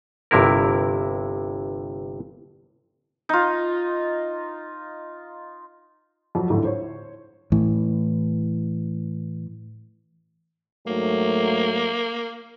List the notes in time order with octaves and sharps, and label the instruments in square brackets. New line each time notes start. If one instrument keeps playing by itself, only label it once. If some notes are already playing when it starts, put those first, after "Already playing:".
[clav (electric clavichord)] G1 G2 C3 E4 A#4
[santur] D#4 F4
[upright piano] F2 F3 F#3
G#1 D#2 A2 D3 E3
C5 C#5
[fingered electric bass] A2 E3
[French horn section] G#2 F#3 A3 [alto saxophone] A#3